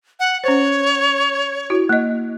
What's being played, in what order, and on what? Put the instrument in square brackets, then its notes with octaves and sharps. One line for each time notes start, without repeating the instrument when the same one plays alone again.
[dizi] F#5
[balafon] C#4 C5 [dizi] C#5
[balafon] E4 F#4
A#3 D#5